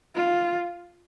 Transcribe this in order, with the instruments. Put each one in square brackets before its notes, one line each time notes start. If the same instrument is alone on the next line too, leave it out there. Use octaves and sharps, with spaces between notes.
[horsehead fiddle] F4